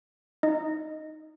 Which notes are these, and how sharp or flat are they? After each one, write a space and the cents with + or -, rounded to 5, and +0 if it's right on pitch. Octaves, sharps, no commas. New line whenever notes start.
D#4 +0 D#5 +0